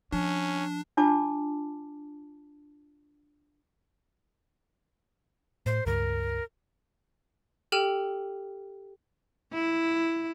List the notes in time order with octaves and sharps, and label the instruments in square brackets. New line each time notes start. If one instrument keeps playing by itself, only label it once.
[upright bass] F3 [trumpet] C#4 [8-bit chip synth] D4
[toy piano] D4 F4 A5 D6
[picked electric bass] A2 [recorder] C5
[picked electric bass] C#2 G2 G3 [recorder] A#4
[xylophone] G4 A4 G5 F6 D#7 E7
[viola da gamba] E4